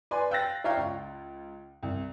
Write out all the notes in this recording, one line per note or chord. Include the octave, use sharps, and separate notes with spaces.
B4 D5 G#5 C6
F5 G5 E6 F#6 A6 A#6
C#5 D5 E5 F5 G5 A#5
C#2
C2